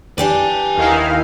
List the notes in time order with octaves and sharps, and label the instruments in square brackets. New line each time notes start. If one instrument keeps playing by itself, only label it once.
[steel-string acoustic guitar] D4 G4 D5 [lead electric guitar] B4 G#5
[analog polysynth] D#2 D#4 E4 [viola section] D#3 F5